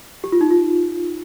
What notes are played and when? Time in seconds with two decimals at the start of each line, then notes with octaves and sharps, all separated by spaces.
0.24 G4
0.32 F4
0.41 D#4
0.51 F4